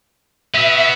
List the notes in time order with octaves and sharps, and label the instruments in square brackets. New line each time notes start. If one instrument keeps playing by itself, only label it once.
[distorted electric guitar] B3 F#4 [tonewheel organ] E5